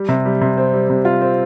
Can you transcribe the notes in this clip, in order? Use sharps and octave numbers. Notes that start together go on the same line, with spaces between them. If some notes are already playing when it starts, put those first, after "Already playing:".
Already playing: G3
C3
G3
C3
C4
G3
C3
F4
C4